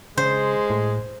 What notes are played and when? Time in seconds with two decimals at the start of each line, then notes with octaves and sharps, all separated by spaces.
0.17 C#3 G#3 C5
0.70 A2